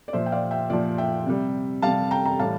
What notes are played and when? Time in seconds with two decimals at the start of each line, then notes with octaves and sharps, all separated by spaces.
0.08 D5
0.13 A#2 F3 C5 E5
0.26 G5
0.32 D5 F5
0.51 E5 G5
0.70 A#2 F3 D5
0.98 E5 G5
1.26 C3 G3
1.82 C3 G3 F5 A5
2.11 G5 A#5
2.25 G5 A#5
2.39 A2 E3 G3 F5 A5